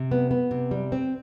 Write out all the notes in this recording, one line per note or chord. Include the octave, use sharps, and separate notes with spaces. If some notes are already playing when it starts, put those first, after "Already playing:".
Already playing: C3
B3
B3
C3
G3
C4